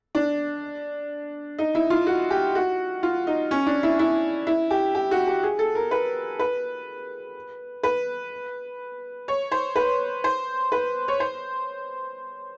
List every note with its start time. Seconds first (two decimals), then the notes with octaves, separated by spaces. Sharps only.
0.15 D4
1.59 D#4
1.75 E4
1.90 F4
2.07 F#4
2.30 G4
2.55 F#4
3.03 F4
3.27 D#4
3.51 C#4
3.67 D4
3.83 E4
3.99 E4
4.47 E4
4.71 G4
4.95 G4
5.11 F#4
5.27 G4
5.43 G#4
5.59 A4
5.75 A#4
5.91 B4
6.39 B4
7.83 B4
9.28 C#5
9.52 C5
9.76 B4
10.24 C5
10.72 B4
11.08 C#5
11.20 C5